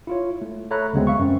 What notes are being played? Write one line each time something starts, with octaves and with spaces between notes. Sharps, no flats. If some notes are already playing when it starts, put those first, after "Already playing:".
E4 F4 C#5
A3
A4 C#5 E5 A#5 B5 F#6
D2 C#3 F#3 G#3 B3 C4
E5 F5 C#6
F#2 A3 C4 C#4